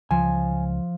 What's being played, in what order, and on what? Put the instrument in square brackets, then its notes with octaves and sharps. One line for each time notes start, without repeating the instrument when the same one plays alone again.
[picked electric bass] C#2 [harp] F3 [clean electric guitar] G#5